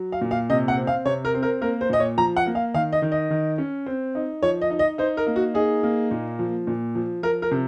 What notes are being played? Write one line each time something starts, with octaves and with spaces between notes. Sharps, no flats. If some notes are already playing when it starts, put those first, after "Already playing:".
Already playing: F#3
F5
A#2
F5
C3 D#5
F#5
C4
F5
C3 C#5
A#4
C4
A#4
A#3 A#4
C5
A#2 D#5
C#5
F3 A#5
F#5
A#3
F5
D#3 F5
D#5
D#3
D#5
D#3
C#4
C4
D#4
F3 C#5
D#5
D#4
D#5
D#4 C5
A#4
A#3
F#4
D#4 G#4
A#3
A#2
F3
A#2
F3
F3 A#4
A#4
C3